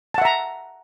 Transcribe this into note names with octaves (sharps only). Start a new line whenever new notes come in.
E5 F#5 A5 A#5